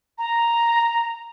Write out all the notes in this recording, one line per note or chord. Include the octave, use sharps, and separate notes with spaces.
A#5